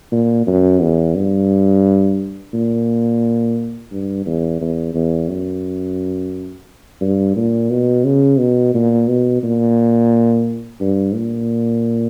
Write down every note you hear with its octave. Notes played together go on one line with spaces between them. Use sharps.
A#2
F#2
E2
G2
A#2
G2
E2
E2
E2
F#2
G2
A#2
B2
C#3
B2
A#2
B2
A#2
G2
A#2